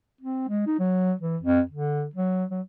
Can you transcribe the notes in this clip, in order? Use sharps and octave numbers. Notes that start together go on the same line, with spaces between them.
C4
G#3
D#4
F#3
E3
F2
D3
F#3
F#3